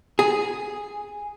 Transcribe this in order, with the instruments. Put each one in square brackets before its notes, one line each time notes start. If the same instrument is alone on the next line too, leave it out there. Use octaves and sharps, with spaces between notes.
[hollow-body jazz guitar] G#4